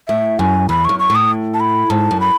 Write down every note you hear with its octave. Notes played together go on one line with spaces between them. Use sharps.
A2 E5
F#2 G#5
E2 B5
F#2 C#6
C#6
A2
D#6
A5
B5
G#2 A5
F#2
B5